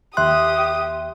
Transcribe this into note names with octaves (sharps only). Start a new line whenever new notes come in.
D#2 G4 E5 C6 D#6 F#6